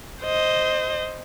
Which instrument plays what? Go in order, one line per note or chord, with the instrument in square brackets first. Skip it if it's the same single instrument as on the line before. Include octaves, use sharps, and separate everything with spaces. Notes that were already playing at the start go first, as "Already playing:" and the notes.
[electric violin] C5 D#5